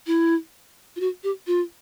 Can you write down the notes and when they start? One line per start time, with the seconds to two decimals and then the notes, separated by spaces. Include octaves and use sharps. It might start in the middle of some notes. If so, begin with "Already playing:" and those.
0.07 E4
0.96 F4
1.00 F#4
1.23 G4
1.47 F4